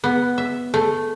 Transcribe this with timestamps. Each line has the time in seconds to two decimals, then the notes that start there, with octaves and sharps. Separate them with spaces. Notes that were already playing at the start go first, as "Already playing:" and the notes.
0.04 B3
0.38 E5
0.74 A3